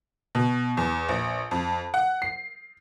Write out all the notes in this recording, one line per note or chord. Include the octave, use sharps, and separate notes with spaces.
B2
E2
A#1
F2
F#5
C7